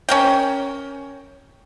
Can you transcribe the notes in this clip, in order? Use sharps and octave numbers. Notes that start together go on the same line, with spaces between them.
C#4 A#4 G5